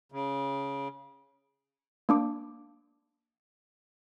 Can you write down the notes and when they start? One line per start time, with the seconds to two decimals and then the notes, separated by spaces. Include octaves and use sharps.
0.12 C#3
2.09 A#3 D4 D6